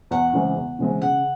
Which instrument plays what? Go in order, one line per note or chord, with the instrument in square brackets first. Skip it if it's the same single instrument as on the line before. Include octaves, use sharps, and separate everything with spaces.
[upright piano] E2 [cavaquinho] F#5
[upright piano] C#3 E3 G#3 C4
E2
C#3 E3 G#3 C4
[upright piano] C#3 [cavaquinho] F#5